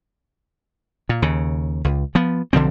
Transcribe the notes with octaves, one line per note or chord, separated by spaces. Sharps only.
A#2
D#2 C#3
C#2
F3 B3
B1 D3 F3 C4